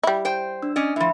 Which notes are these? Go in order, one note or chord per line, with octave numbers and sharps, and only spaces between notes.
G3 E4
C5 G5
D4 E6
C#4 D5 D#5
A2 F3 E5 B5